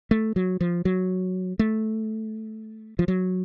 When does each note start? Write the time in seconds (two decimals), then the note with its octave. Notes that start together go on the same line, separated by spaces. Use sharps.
0.11 A3
0.36 F#3
0.61 F3
0.85 F#3
1.59 A3
2.99 F3
3.08 F#3